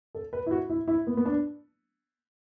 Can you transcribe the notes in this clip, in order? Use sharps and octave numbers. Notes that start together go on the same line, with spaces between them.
A4
B4
E4
F#4
E4
E4
B3
B3
D4